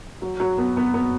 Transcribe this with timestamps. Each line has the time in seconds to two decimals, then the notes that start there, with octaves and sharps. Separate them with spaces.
0.22 F#3
0.40 F#3
0.58 B3
0.77 B3
0.94 B3